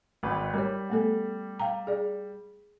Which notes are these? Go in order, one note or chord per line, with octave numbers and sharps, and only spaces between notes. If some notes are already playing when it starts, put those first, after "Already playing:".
G#1 G#2 B4
G3 A#4 C#5
A3 B3 A4
F5 G5 A#5
G#4 D5